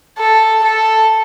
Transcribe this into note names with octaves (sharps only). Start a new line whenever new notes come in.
A4
A4